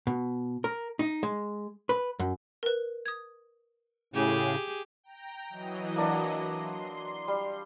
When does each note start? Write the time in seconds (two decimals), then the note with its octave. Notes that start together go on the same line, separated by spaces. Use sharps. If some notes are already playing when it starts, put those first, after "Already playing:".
0.07 B2
0.64 A#4
0.99 D#4
1.23 G#3
1.89 B4
2.20 F#2
2.63 A#4 B4
3.06 D#6 G#6
4.14 A2 C#3 G4 G#4
5.04 G5 A#5
5.49 E3 F#3 D#5
5.96 A#3 D4 F#4
6.53 C6
7.28 G3